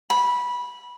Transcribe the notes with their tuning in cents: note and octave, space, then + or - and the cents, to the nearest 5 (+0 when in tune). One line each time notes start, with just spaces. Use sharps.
B5 -15